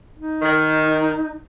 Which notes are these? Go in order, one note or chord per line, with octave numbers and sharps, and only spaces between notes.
D#4
D#3